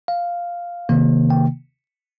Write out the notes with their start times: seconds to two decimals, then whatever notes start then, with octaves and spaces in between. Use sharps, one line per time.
0.08 F5
0.89 C3 D#3 A#3
1.30 G5